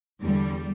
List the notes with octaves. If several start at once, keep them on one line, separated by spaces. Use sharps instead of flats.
E2 D3 G3